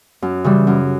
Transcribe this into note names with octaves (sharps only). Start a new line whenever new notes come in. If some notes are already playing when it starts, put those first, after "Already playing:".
F#2
C#3 E3 G3
F#2